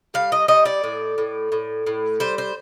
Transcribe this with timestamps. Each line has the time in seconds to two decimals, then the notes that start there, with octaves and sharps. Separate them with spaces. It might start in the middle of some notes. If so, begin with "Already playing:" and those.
0.14 G3 F5
0.32 D#5
0.48 G3 D#5
0.65 D5
0.84 A2
1.18 A2
1.52 A2
1.87 A2
2.20 G3 C5
2.38 C5